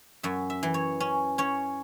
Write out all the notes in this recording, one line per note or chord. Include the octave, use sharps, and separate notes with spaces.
F#2 E5
E5
E3
C#5
C#4
C#4 C#5